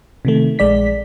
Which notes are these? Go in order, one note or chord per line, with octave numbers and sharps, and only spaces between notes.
C3 D#3 A3
A#1 G#3 D5 B6